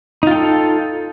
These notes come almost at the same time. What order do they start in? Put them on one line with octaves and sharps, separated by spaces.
D#4 F4 G5 A4